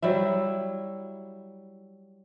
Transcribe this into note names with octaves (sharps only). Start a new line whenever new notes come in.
F#3 G3 E4 E5